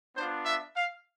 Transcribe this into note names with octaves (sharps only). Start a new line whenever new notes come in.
B3 D4 F4 C5
E5
F5